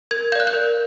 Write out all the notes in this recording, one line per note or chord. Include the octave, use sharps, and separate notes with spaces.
A#4 G#6
D5 F5 F#6 G6
G6
A#4